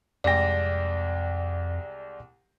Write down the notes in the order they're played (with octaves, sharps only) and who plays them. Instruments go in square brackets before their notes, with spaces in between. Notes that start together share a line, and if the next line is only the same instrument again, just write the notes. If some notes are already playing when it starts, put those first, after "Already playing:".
[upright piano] C2 G#3 G5 [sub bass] F2 [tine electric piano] D5 A#6